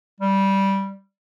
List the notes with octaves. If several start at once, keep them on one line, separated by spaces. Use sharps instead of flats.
G3